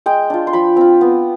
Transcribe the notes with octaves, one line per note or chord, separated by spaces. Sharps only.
G#3 G5
D4 F4
C6
F3 B5
C4 F4
B3